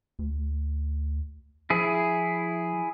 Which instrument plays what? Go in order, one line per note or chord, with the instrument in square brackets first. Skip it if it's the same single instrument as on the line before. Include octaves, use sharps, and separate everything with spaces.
[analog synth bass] D2
[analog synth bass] F3 [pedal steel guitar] E4 G#4